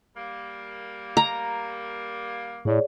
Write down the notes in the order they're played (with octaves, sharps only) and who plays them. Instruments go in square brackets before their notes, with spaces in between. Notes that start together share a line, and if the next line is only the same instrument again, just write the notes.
[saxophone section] G3 A#3
[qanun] A#5
[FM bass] A2 [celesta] G#4 C#5 D5